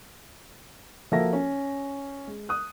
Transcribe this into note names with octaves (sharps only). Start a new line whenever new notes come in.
F3 A#3 F#4 A4 E5 A#6
C#4
G#3
D#6 F#6